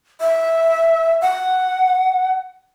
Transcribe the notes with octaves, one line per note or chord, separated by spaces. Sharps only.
E5
F#5